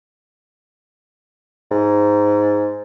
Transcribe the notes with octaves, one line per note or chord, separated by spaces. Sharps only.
G#2